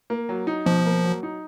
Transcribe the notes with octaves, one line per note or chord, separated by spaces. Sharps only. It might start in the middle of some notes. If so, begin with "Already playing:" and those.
A#3
F#3
D#4
B2 F3
A#3
F#3
D#4